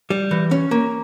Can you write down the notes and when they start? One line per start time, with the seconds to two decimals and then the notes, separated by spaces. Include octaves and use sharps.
0.10 G3
0.31 E3
0.51 C#4
0.71 A#3